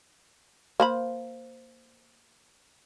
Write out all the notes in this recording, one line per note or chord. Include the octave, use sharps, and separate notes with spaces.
A#3 C5 B5